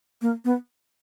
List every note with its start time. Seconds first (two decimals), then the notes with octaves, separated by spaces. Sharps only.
0.22 A#3
0.45 B3